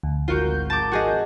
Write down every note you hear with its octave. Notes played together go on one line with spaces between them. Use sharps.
D2
G#1 F4 F#4 A#4 G6
A5 D6
F#4 G#4 D#5